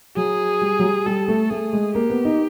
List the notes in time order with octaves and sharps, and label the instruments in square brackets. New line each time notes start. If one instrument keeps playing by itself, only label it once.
[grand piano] F#3 [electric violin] G#4
[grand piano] G3
F#3
G3
[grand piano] G3 [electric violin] A4
[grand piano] A3
[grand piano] A3 [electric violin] G#4
[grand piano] G#3
[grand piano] A#3 [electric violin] G4
[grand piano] B3
D#4